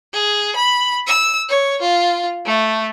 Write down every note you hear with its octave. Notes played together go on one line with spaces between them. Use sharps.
G#4
B5
E6
C#5
F4
A3